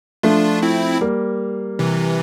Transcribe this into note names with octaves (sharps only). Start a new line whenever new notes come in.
F3 A3 D4 F4
C4 E4
G3 A#3
C3 E3